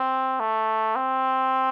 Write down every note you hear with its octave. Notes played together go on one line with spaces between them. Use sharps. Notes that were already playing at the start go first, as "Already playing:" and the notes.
Already playing: C4
A3
C4